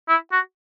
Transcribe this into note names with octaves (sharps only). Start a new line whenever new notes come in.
E4
F#4